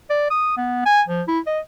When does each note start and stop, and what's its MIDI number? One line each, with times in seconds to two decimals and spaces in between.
0.10 0.27 74
0.31 0.55 87
0.57 0.85 59
0.86 1.02 80
1.08 1.22 53
1.27 1.39 64
1.47 1.59 75